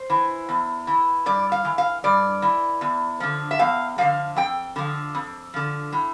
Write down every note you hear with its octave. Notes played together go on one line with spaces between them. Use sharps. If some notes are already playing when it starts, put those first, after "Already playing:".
Already playing: C5
E3
E2
E3
G2 D5
F5
E3
F5
G2 D5
E3
E2
D3 F3
E5
E2 F5
D3 F3 F5
F2 G5
D3 F3
F2
D3 F3
A2